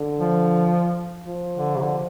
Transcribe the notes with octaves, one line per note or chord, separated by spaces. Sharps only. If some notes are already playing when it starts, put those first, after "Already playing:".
Already playing: D3
F3
F3
D3
C3
D3